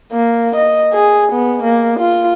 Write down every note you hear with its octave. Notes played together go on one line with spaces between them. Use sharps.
A#3
D#5
G#4
B3
A#3
F4